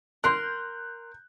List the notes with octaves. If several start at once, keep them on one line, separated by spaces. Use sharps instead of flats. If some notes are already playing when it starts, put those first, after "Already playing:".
A#4 C6 F#6 G6